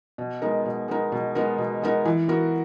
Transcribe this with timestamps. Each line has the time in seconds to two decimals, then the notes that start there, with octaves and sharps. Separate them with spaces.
0.18 B2
0.42 G#3 B3 D#4 A#4
0.66 B2
0.88 G#3 B3 D#4 A#4
1.12 B2
1.35 G#3 B3 D#4 A#4
1.58 B2
1.82 G#3 B3 D#4 A#4
2.05 E3
2.28 B3 F#4 A#4